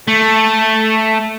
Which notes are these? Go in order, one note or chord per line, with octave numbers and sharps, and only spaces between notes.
A3